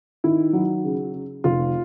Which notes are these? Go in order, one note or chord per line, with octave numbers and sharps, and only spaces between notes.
D#3 E4
F#3
C#3
C#3
F1 F4